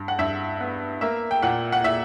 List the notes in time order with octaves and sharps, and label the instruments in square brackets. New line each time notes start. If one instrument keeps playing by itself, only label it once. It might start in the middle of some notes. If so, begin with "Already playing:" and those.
Already playing: [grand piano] G2
F#5
G2 E5
B3
A#3 E5
G5
A#2 F#5
F#5
A#2 E5